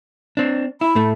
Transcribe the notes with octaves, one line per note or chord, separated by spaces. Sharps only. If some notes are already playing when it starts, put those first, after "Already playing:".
C4 D4
E4 B5
A2 A3